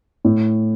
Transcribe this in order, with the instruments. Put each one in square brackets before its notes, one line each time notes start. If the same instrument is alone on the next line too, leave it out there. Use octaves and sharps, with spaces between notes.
[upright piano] A2